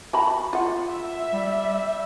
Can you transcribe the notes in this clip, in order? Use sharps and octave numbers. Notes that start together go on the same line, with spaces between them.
F#4 A5 B5
F4 F#5
E5
G3